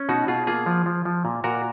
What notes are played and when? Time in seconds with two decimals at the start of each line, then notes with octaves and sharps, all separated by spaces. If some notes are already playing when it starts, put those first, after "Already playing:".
Already playing: C#4
0.09 B2 D#4 F#4
0.28 B2 F4 G#4
0.47 A#3 F4 G#4
0.66 F3
0.86 F3
1.05 F3
1.25 A#2
1.44 A#2 F#4 A#4